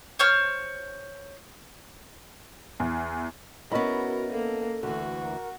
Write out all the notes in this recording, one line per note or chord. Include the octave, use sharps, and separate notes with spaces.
C5 C#5 F6
E2
B3 C#4 E4 F#4 A#4 D#5 B5
A#3 A4
D2 E3 F#4
A#4